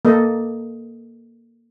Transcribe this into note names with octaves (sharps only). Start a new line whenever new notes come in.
A#3 A4 D#5